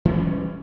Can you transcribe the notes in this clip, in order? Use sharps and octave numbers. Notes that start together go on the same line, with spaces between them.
E3 G3 G#3 C#4